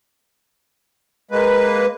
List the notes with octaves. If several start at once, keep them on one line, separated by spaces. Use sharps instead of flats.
G#3 A#3 B4